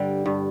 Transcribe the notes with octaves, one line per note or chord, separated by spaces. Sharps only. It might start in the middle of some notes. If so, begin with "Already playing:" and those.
Already playing: G2 D3 G3
G2